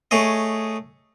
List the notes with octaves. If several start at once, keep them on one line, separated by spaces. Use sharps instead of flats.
A3 G#4 C#5 D#5